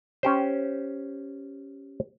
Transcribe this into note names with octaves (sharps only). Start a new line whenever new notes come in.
C#4 G4 C5